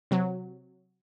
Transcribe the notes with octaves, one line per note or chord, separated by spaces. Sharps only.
C3 F#3